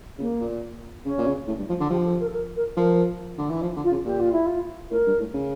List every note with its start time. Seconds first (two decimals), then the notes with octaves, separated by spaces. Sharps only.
0.19 C#3 A#3
0.41 A#2
1.04 C#3 C#4
1.18 A#2
1.27 C#3
1.48 A2
1.58 G2
1.69 F3
1.81 D3
1.90 F3 G4
2.05 A4
2.20 A#4
2.27 A4
2.34 A#4
2.56 A#4
2.77 F3 A#4
3.38 D3
3.50 E3
3.62 F3
3.76 D3
3.84 F4
3.91 C#3
4.05 A#2 G4
4.19 F4
4.32 E4
4.45 F4
4.91 A2 A#4
5.06 G2
5.19 A2
5.34 C#3